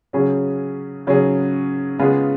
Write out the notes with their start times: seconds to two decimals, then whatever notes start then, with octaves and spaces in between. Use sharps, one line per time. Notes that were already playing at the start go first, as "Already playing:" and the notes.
0.13 C#3 F#3 C#4 G#4
1.07 C#3 F#3 C#4 G#4
1.99 C#3 G#3 B3 F4 G#4